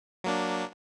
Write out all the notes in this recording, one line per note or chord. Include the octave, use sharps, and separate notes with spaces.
F#3 A#3 D4